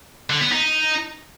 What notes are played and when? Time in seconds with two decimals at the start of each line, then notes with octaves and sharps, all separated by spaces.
0.30 D3
0.41 B3
0.52 D#4